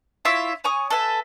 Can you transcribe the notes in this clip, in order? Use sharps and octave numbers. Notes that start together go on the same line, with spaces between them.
E4 F4 C#5 E5
C#5 G#5 C#6 D#6
A4 B4 E5 G#5